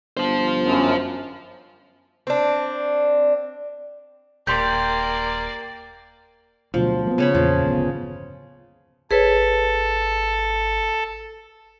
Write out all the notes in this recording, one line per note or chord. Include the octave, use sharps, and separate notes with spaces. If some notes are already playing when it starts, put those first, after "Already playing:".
G1 F4 C5
F#2
C4 D4
D#1 A#3 G4 D5 C6 G6
D2 B2 F3 F#3
A#3 B3
C#3 C#5 B5
E2 A#2 F3
D1 G1 B3
G#1 G#4 A4 B4 C#5